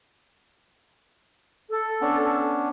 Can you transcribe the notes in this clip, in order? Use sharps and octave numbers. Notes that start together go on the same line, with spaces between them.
A4
B3 C#4 D4